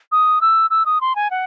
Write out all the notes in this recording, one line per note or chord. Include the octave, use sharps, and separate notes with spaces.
D#6
E6
E6
D#6
C6
G#5
F#5